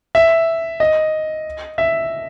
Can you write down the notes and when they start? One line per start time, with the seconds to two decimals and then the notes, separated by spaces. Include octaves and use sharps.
0.15 E5
0.80 D#5
1.78 E5